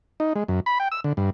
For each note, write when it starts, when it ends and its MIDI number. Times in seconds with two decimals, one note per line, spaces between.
0.20 0.33 63
0.36 0.44 56
0.48 0.60 42
0.66 0.78 83
0.80 0.88 79
0.92 1.00 88
1.04 1.13 50
1.17 1.30 43